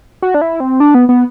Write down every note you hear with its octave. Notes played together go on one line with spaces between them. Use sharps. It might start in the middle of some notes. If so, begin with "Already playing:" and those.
F#4
D4
E4
C4
D4
B3
B3